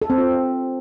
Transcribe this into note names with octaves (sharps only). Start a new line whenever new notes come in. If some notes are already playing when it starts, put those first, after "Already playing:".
A4
C4
F4